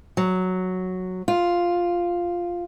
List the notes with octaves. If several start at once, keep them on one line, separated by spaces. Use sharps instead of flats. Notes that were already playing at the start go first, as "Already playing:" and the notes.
F#3
F4